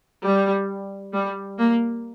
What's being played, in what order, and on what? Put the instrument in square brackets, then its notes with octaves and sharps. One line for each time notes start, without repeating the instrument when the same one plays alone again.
[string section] G3
G3
A#3